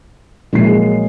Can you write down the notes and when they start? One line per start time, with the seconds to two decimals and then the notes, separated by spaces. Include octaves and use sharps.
0.53 A#1 F#3 G#3 A#3 C7